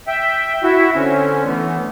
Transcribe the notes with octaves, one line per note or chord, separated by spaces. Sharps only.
E5 G5
E4 F#4 E5
D3 C4 C#4
E3 A3 B3